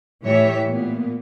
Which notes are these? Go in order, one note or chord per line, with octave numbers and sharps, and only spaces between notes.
A2 E3 A3 G4 C#5 E5
A#2 A#3 B3